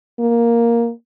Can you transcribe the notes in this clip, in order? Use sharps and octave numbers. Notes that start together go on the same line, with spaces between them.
A#3